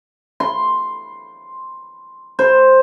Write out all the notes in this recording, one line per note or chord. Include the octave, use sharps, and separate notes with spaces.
C6
C5